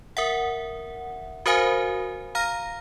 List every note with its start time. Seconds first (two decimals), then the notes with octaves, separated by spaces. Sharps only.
0.17 A#4 E5 F#5
1.46 F#4 A#4 C5 F5 G#5
2.35 F5 A#5 F6 A#6